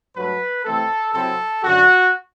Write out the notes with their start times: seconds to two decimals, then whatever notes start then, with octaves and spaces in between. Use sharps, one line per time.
0.16 G2 F#3 A3 B4
0.65 C3 E3 A3 C4 A4
1.14 C3 F#3 C4 E4 A4
1.64 F#2 D3 F#3 F#4